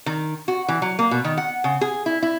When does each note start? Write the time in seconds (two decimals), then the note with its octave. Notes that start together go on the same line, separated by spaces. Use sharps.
0.06 D#3
0.48 F#4
0.68 E3
0.82 F#3
0.99 A#3
1.11 B2
1.24 D#3
1.37 F#5
1.64 C#3
1.81 G#4
2.06 E4
2.22 E4